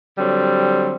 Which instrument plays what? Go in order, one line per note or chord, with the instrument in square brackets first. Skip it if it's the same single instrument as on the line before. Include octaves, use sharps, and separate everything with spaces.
[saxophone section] D3 F#3 G3 C4